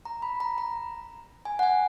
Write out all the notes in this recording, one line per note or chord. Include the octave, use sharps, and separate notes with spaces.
A#5
B5
A#5
A#5
G#5
F#5
G#5